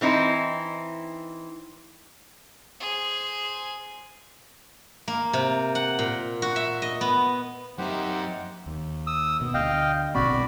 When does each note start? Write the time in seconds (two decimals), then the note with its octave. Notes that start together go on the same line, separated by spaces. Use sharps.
0.01 E3 C4 D#4 E4
2.80 G#4 C5
5.08 A#3
5.33 C3
5.75 F#5
5.99 A#2
6.42 F#4
6.56 E5
6.82 D#5
7.01 B3
7.78 F#2 A#3 C4 D#4 G4 C5 E5 F#5
8.66 D#2
9.07 D#6 E6
9.41 B2
9.54 D2 D#5 F5 G5
10.15 B1 B2 C4 F#4 D5 B5